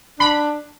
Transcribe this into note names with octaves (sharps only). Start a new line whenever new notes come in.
D4 B5